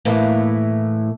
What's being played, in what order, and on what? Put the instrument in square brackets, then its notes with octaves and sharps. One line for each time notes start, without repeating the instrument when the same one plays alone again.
[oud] A2 E3 A#3